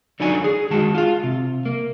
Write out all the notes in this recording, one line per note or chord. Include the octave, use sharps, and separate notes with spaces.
D3 F#3 D#4 D5 G#5
G#4
D#3 G#3 F#4 A5
F4 F5
C3
A#3